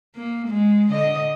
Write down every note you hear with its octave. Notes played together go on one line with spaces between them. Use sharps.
A#3
G#3
D3 D#5